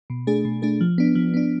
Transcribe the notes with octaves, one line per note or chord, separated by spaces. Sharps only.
B2
A3 D4 G#4
B2
A3 D4 G#4
F3
B3 D4
F3
B3 D4